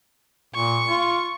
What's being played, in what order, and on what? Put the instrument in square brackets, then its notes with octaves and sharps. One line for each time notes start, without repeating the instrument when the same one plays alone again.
[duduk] A#2 [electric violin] C#6
[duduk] F4